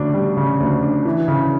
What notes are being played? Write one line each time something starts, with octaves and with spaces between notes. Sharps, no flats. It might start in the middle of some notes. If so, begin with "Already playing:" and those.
Already playing: D2 C#3 D4
G3
C#3
D2
D4
E3
C#3